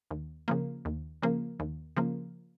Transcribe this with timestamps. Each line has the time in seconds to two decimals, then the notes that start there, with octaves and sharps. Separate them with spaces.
0.11 D#2
0.48 C#3 F3 A#3
0.85 D#2
1.22 C#3 F3 A#3
1.60 D#2
1.97 C#3 F3 A#3